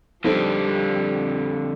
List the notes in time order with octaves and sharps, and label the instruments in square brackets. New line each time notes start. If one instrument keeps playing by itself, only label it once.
[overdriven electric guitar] F2 D3 [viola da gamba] F3 G3 [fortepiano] C4 D#4 A4